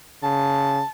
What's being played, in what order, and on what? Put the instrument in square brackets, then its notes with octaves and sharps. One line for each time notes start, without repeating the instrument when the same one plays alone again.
[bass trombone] C#3 [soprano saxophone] A5